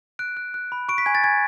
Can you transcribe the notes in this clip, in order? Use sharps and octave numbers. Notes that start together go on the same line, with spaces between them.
F#6 D7
F#6
F#6
B5
C#6 D7
B6
G#5 G#6
A6
G#5 G#6